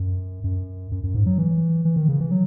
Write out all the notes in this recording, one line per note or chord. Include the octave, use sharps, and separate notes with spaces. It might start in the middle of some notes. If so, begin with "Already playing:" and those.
Already playing: F#2
F#2
F#2
F#2
G#2
F#3
E3
E3
D#3
C#3
E3
F#3